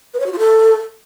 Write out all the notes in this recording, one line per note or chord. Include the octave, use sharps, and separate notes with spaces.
B4
C#5
F#4
F4
A4